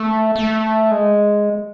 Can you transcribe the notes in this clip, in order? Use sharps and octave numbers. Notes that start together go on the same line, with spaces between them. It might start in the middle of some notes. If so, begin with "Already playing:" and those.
Already playing: A3
A3
G#3